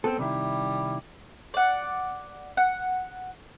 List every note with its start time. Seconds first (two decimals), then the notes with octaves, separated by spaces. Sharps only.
0.04 B3 C4 A4
0.18 C3 D#3 G3 E4
1.54 D5 F#5
2.57 F#5